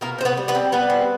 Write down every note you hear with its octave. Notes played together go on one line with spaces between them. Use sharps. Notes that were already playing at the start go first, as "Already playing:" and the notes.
B2 A#3 A#4
C4 C5
B3 B4
G3
B3 B4
C4
G3 B3 B4
C4